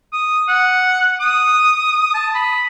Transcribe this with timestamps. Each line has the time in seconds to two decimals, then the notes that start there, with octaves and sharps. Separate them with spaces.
0.13 D#6
0.48 F#5
1.20 D#6
2.14 A5
2.35 B5